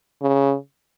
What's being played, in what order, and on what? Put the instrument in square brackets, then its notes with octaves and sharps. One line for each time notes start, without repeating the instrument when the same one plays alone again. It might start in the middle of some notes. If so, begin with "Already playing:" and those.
[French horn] C#3